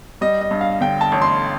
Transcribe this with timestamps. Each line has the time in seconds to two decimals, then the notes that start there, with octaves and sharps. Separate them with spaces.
0.21 G3 D#5
0.41 D#5
0.51 G2
0.61 F5
0.81 D3 G5
1.01 A5
1.12 A1
1.22 C6